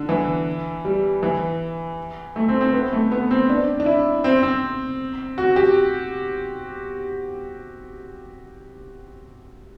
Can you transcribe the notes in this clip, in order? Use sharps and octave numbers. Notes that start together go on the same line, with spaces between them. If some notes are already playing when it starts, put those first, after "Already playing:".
Already playing: D3
E3
G3
E3
A3
C4
C4
B3
A3
B3
C4
D4
D4
E4
C4
C4
F#4
G4